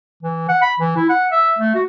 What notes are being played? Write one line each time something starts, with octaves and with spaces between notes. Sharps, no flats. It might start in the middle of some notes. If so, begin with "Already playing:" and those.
E3
F#5
B5
E3
E4
F#5
E5
A3
F#4